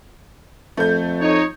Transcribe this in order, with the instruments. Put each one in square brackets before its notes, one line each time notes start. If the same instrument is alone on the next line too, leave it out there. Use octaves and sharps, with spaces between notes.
[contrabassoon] F2 [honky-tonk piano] A3 G6
[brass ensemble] D#4 C#5